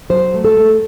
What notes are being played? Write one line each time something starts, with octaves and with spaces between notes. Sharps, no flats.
F#3 C5
A3
A4
A3